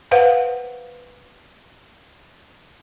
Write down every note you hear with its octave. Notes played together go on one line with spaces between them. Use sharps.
B4 C5 F5 F#5